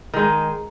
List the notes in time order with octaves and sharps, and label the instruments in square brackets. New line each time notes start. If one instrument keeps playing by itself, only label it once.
[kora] D#3 G#3 D#4